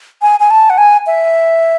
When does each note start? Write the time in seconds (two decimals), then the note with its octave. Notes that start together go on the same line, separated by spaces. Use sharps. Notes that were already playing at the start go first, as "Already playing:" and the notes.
0.22 G#5
0.40 G#5
0.51 A5
0.70 F#5
0.78 G#5
1.07 E5